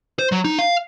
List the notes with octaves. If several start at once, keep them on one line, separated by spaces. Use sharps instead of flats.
C5
F#3
D#4
F5